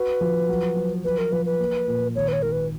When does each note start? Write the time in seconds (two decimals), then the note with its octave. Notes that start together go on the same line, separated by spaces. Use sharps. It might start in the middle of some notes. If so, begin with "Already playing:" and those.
Already playing: F#4 B4
0.21 F3
0.49 F#3
0.76 F#3
1.04 F3 B4
1.18 A#4
1.32 F3 B4
1.46 B4
1.60 A#3
1.88 A#2
2.15 G#1 C#5
2.28 B4
2.33 C#5
2.42 G#1 A#4
2.52 B4